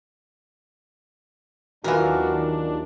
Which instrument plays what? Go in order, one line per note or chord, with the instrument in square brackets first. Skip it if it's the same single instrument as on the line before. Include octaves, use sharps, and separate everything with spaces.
[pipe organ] D#2 D4 [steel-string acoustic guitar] D#3 F#3 F4 [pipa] E3 A#4 [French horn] F#4